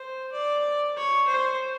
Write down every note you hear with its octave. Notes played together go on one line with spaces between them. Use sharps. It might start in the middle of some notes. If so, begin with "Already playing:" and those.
Already playing: C5
D5
C#5
C5